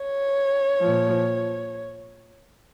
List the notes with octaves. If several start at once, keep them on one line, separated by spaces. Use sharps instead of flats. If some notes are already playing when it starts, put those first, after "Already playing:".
Already playing: C#5
A#2 F3